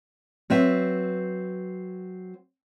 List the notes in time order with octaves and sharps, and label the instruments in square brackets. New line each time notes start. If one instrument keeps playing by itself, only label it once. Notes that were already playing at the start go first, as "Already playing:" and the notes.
[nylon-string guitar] F#3 C4 B4 E5